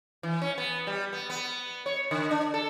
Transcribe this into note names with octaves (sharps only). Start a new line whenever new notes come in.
E3
C#4
B3
G3
B3
B3
C#5
D3
D4
A4